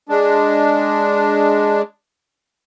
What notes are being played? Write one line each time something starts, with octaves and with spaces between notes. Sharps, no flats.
G#3 D4